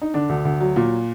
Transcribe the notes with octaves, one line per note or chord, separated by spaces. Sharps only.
D#4
D3 D4
D2
D2
F#3
A#2